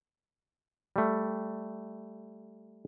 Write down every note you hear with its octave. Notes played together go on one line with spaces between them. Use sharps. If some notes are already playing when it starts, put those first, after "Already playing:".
G3 A3